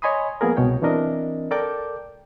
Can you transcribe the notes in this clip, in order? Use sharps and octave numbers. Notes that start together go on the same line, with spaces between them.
C#5 D#5 G#5 B5 C6 D#6
F3 A#3 B3 G#4 A#4
C2 B2 C#5 G5
E3 C4 D4 A#4 D#5
A4 A#4 D5 G5 D6 G6